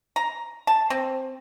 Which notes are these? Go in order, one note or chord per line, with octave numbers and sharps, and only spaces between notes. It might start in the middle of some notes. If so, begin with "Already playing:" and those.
A#5
A5
C4